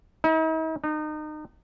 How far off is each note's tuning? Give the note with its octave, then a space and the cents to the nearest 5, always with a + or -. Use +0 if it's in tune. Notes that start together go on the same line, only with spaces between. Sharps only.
D#4 +45
D#4 -30